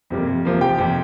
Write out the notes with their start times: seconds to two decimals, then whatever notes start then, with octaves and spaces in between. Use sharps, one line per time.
0.10 F2 C3 G3 A#3
0.27 F2
0.45 C3 F3 A#3
0.61 F1 G4 G5
0.78 F2 C3